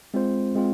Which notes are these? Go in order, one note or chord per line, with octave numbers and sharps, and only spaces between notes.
G#3 C4 F4 C5
G#3 C4 F4